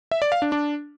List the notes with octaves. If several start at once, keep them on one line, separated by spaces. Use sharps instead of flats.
E5
D5
F5
D4
D4